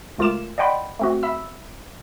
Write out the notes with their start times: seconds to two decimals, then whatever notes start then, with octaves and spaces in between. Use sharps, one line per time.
0.18 C#2 A3 F4 A#4 D6 E7
0.58 D5 D#5 F#5 G5 B5 C6
0.99 A3 C4 F#4
1.23 E5 B5 E6